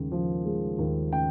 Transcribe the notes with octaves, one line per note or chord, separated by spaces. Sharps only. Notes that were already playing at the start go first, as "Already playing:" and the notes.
Already playing: D#2 C#3 G#3
F3
G#3
D#2
C#3 G5